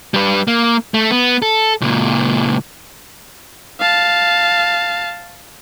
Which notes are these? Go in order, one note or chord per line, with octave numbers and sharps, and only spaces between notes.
G3 B4
A#3
A3
B3
A4
C#2 A#2
F5 A5